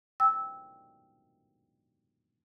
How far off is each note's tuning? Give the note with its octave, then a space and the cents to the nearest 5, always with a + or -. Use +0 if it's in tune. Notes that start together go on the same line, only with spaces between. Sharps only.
G5 +0 E6 -15